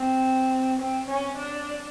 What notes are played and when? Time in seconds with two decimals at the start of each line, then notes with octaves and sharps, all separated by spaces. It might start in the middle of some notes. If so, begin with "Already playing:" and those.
Already playing: C4
0.80 C4
1.09 C#4
1.38 D4